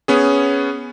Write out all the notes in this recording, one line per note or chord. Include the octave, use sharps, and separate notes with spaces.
B3 C#4 G#4